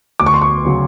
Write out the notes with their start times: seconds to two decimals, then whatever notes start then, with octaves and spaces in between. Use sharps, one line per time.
0.20 D2 D6
0.26 C#6
0.34 C6
0.42 C#6
0.65 C#3 F#3